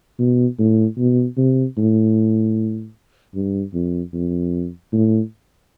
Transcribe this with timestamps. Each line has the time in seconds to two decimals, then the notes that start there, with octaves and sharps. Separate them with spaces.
0.19 B2
0.58 A2
0.98 B2
1.37 C3
1.77 A2
3.35 G2
3.74 F2
4.13 F2
4.93 A2